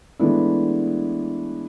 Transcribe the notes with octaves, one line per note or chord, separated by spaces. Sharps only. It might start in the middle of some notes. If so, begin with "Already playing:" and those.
E3 G#3 A3 B3 D4 E4